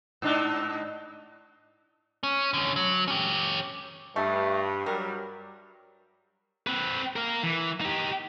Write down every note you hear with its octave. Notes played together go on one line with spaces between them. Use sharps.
G#2 D4 D#4
C#4
D3 C#4
F#3
C#4 G4
G2 A3
F#3 G3 A#4
C4 B4
A#4 F5
E3
D#4 G4